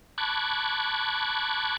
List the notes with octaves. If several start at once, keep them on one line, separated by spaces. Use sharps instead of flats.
A5 B5 C#6 D6 F#6 G#6